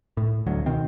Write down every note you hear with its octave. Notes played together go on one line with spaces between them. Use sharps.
A2
D1 D2 F#3
B2 D#3 C4